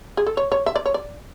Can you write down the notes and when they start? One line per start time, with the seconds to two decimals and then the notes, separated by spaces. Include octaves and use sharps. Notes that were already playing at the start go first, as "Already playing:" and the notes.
0.17 G#4
0.27 A4
0.37 C#5
0.52 C#5
0.66 E5
0.76 D5
0.86 C#5
0.94 D5